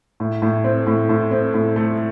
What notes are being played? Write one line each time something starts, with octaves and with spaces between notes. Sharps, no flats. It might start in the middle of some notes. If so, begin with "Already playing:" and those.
A2
A2
C4
A2
A2
C4
A2
A3